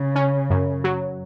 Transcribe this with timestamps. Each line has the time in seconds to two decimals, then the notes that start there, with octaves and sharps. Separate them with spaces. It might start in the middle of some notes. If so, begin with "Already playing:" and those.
Already playing: C#3
0.15 C#4
0.50 F#2
0.84 F#3